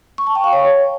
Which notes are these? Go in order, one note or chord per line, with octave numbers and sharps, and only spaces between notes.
C#6
A5
G5
F5
C#5